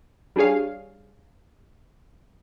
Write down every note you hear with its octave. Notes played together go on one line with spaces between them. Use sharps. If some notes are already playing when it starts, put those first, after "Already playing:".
G3 D4 G4 G#4 C#5 F5